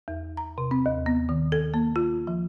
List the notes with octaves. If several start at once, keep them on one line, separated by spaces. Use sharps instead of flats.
E2
A#5
C3
C4
D#2
B3
D#3
A4
A#3
F4
F3